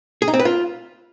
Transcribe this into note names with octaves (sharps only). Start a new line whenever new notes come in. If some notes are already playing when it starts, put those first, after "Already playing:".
G#4
D#4
C4
B4
F4